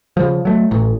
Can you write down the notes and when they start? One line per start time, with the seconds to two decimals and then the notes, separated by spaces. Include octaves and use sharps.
0.17 C#3 F3
0.45 F#3 A3
0.71 A1 A2